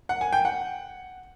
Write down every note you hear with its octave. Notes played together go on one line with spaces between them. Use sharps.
F#5
G#5
G5
F#5